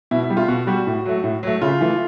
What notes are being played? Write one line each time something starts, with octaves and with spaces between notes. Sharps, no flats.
B2 E4
E4
G3
F4
B2 F#4
G3 F#4
A2
F#3 A3
A2
F#3 A3
C#3 F4
E3 A3